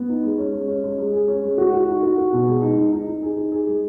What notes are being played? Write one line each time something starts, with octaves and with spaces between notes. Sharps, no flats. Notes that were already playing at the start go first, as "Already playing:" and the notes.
Already playing: B3
D#4
G#3
C#4
G#3
C#4
G#3
G#3
G#4
C#4
G#3
F#4
F#4
D#4
F#4
F#4
B2
G#3
D#4
D#4
D#4
D#4
G#4
D#4
G#4
G#3